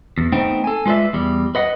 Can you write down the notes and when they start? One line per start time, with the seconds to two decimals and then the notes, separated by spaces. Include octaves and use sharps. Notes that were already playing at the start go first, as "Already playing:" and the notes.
0.18 E2
0.32 A3 B3 C4 D#4 C5 G5
0.64 A4 G#5
0.86 G#3 F4 B4 D5 E5
1.13 E2 G3
1.55 B4 D#5 F#5